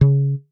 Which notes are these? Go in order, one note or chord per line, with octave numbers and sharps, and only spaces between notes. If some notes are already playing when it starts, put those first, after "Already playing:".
C#3